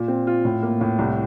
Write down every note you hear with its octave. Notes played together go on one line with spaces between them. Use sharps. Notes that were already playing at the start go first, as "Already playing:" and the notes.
Already playing: A#2
C4
F4
A2
A#3
A2
C2